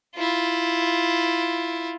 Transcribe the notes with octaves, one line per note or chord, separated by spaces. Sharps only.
E4 F4